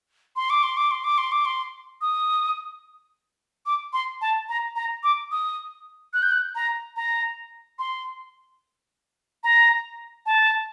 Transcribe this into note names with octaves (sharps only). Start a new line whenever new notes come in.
C6
D6
C6
D6
C6
D6
C6
D6
C6
D#6
D6
C6
A5
A#5
A#5
D6
D#6
F#6
G6
F#6
A#5
A#5
C6
A#5
A5